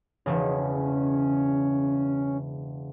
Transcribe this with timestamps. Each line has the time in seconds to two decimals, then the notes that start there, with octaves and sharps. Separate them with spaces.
0.26 E1 C#3 C#4